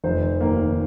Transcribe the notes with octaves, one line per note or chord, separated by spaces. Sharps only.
F1 C5
D#2 D#3 A#3